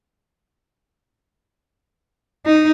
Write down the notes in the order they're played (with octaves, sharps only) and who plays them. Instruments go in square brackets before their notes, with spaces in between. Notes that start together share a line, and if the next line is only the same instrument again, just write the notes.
[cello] D#4